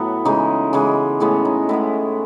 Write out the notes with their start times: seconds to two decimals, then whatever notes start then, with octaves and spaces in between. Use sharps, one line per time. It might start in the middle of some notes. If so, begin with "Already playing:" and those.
Already playing: A2 F#3 B3 F#4
0.25 C#3 E3 G#3 D#4
0.73 C#3 E3 G#3
1.20 A2 G#3 B3 C#4
1.45 D#4
1.69 A2 G#3 B3 E4